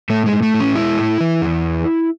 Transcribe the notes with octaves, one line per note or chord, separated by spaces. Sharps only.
A2 A3
G#3
A2
A3
A2
C#4
G#3 E4
A2
E3
E2